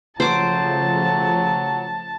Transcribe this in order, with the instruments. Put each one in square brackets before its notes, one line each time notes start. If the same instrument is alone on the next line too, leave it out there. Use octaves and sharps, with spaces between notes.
[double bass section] C#3 F3 A3 [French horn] F#3 [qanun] C5 D6 [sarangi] A5